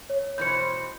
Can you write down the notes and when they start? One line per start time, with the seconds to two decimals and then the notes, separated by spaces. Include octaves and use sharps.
0.10 C#5
0.38 B2 E3 C5 G6 C#7